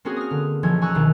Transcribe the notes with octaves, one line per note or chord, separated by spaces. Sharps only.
A#3 C4 C#4 F#4 G#4
D#6 F6
D3
B1 E3 F3 C#4 G#6
G#5 A#5 C#6 E6 F#6
C2 B2 D#3